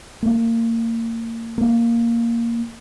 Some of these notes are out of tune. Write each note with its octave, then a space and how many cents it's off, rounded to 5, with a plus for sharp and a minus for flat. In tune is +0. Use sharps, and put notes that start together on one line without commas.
A#3 -30
A#3 +0